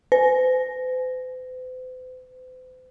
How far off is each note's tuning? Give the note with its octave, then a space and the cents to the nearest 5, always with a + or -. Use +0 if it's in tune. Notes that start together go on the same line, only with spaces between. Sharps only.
C5 -45